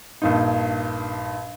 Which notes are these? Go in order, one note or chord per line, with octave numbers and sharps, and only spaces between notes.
A#1 G2 D#4